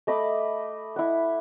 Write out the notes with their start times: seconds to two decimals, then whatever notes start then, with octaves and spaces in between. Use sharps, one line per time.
0.07 A3 D#5 B5 D6
0.96 E4 F#5